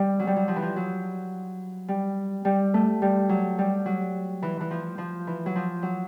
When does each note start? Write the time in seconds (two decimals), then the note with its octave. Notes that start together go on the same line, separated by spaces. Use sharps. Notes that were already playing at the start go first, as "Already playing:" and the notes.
Already playing: G3
0.19 F#3
0.27 G3
0.36 F#3
0.48 F3
0.56 E3
0.62 F3
0.76 F#3
1.88 G3
2.45 G3
2.74 A3
3.02 G3
3.29 F#3
3.58 G3
3.86 F#3
4.42 E3
4.61 E3
4.70 F3
4.98 F3
5.27 E3
5.46 F#3
5.55 F3
5.82 F#3